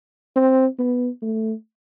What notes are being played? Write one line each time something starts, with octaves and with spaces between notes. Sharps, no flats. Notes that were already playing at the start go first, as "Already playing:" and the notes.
C4
B3
A3